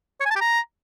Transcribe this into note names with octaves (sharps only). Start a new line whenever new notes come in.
C#5
G#5
A5
G4
A#5